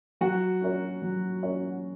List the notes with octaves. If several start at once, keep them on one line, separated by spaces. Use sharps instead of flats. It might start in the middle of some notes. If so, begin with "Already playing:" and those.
F#3 F#4
C#4 A#4 C#5
F#3
C#4 A#4 C#5